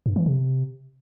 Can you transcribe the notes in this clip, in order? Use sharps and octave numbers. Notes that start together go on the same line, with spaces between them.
G2
E3
C3